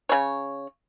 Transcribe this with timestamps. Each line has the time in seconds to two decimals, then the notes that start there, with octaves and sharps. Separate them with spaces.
0.09 C#3 C#5